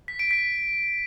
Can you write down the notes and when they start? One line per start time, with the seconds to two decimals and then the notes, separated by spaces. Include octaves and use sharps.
0.08 B6
0.19 D7
0.31 B6